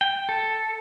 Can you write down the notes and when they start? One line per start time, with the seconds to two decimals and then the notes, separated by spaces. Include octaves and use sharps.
0.01 G5
0.29 A4